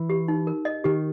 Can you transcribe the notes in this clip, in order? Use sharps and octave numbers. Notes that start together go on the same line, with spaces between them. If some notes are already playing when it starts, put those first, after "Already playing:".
Already playing: E3
G4
D#4
A#4
D#5
D#3 G4